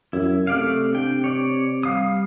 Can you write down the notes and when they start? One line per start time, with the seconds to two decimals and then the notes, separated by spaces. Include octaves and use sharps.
0.13 F#2 E4
0.47 C3 A3 D5 F5
0.93 D4 G5
1.24 C#5 D5
1.83 G3 F5 D#6